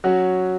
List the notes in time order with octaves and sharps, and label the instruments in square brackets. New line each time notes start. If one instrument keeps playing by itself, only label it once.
[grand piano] F#3 C#4 F#4